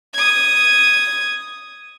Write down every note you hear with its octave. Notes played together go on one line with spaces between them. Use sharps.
D#6 G#6